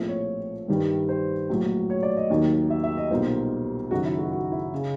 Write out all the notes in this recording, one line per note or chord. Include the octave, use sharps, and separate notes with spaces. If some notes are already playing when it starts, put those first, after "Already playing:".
Already playing: A#1 A2 F3 A3 C4
C#5
G2 D#3 G3
C5
A#1 A2 F#3
C#5
D5
D#5
D#2 D#3 F#3 A#3
E5
E5
D#5
B1 A#2 G3 A#3 C5
F#1 F#2 D#3 F#4
E4
F#4
F#4
E4
C#3